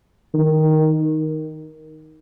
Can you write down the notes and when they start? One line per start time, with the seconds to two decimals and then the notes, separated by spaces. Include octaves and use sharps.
0.34 D#3